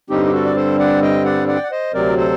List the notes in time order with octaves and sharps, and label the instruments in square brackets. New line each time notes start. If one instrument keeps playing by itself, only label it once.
[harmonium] G2 D3 G3 C4 D#4 G4
G4
F#4 A4
D5
A4 C5
D5 F#5
D#5 G5
D5 F#5
D5 F#5
G5
F#5
C5 D#5
D2 C3 F#3 C4 A#4 D5
A4 C5